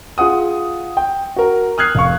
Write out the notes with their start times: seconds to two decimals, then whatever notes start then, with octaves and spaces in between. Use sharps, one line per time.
0.18 F4 G#4 F#5 D#6
0.97 G5
1.36 F#4 A#4
1.78 D#6 F6 F#6 G#6 C7
1.95 F1 F5 C#6